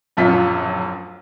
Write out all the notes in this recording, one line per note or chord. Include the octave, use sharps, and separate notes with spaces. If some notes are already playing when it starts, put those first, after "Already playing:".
D1 A#1 F#2 F4 B6